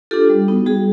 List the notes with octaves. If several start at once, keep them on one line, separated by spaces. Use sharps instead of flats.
D4 F4 G4 A4
G3
B3 D#4 F#4
G3 F#4 G#4